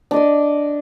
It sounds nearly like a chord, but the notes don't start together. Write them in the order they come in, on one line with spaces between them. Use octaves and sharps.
D4 D#5 D5